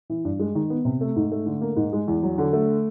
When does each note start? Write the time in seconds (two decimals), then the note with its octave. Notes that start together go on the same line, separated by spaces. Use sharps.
0.10 E3
0.25 G2
0.39 G#3
0.55 D#3
0.70 B3
0.85 C3
1.01 A3
1.16 G#2
1.31 A3
1.46 D3
1.61 A#3
1.76 G#2
1.93 G#3
2.08 E2
2.23 F#3
2.38 D3
2.53 A3